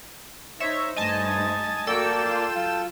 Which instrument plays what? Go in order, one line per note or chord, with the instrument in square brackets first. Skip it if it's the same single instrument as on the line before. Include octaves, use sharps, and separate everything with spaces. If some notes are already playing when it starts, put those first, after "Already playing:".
[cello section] D#4 [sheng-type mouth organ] C5 [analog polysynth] C#5 E5
[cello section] G2 A3 D#4 [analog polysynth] D#5 G#5 A5
[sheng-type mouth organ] A#3 D5 [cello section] F#4 [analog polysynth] A4 G5 E6
[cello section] F4
[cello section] F#3 [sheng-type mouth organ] F4